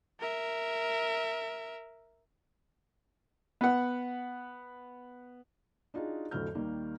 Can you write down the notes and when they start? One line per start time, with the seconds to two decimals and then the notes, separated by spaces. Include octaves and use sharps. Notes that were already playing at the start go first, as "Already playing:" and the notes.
0.20 A#4 E5
3.61 B3 F#5
5.94 D4 D#4 F4 F#4 G#4
6.31 F2 A2 D3 F#3 F6 G6
6.55 D#2 D#3 G3 A#3